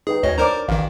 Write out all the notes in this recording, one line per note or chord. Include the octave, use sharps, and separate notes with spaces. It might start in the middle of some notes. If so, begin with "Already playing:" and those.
D#4 G#4 B4 G5
D2 C#5 D#5
D4 A#4 C5 D5 A#5 D6
A1 D#3 F5